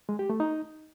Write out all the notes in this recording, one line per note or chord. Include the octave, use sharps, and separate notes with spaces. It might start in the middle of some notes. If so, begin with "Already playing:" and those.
G#3
G4
A3
D#4